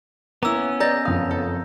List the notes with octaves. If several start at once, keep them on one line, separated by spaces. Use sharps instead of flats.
A#3 B3 C#4 E4 A#5 E6
G#4 B4 D5 D#5 A#5 G6 A#6
F#1 F2 F5 D#6
A4